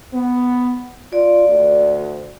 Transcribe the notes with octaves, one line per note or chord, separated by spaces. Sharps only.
B3
F4 D5
D2